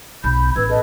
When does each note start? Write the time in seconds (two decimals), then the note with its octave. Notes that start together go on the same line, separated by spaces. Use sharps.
0.24 B1 B5 G6
0.56 A1 B4 E6 G#6
0.69 A4 B4 D#5